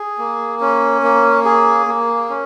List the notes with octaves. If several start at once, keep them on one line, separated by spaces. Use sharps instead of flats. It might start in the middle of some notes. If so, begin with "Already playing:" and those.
Already playing: G#4
A#3
C#4
A#3
G#4
A#3
C#4